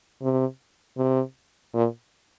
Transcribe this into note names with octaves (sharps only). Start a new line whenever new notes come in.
C3
C3
A#2